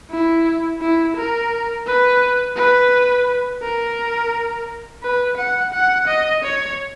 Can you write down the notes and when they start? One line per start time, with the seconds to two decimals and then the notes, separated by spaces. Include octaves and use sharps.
0.11 E4
0.81 E4
1.17 A#4
1.86 B4
2.56 B4
3.62 A#4
5.03 B4
5.37 F#5
5.73 F#5
6.07 D#5
6.44 C#5